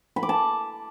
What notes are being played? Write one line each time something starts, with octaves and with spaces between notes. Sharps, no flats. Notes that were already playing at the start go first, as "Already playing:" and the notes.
B5
D6
A5